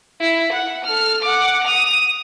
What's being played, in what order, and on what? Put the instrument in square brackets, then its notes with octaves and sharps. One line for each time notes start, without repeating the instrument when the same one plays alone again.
[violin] E4
F#5
A4 F6
F#5 D6
D#6 F7